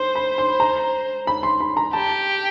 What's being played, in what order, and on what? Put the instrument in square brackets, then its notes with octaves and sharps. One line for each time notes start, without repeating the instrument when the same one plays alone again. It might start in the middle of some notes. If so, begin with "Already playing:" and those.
Already playing: [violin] C5 [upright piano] C6
[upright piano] B5
C6
A#5
B5
C6
B5
A#5
[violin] G4 [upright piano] A5